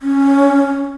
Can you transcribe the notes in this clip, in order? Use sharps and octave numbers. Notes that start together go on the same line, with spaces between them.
C#4